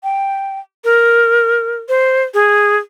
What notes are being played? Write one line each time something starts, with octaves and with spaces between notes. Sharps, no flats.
G5
A#4
C5
G#4